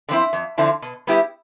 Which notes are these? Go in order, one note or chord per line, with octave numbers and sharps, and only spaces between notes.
D3 F3 C4 E4
F2
D3 F3 C4 E4
B2
G3 B3 E4 G4